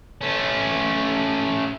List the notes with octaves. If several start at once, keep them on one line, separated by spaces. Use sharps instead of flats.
A3 C#4